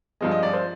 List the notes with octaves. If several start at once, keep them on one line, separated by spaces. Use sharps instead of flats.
G2 F3 G#3 D#5
D#5
D5
C5